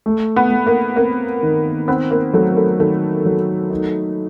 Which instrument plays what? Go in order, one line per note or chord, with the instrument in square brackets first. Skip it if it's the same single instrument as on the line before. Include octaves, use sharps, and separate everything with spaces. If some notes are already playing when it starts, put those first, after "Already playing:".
[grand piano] A3
[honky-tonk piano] B3
[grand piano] A3
[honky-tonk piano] A#3
[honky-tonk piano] A#3 [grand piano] C4
[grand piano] D#3
[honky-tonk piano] B3 [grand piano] C4
[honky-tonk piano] A#3
[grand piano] F#3 [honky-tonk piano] A3
[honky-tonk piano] A3
[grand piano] D#3 [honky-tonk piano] A3
[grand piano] F#3
D#4